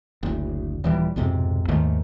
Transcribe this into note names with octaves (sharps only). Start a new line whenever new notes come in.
F#1 D2
D#1 E3 G3
B1 F2 G#2 C3
D#2 G#2 D#3 A3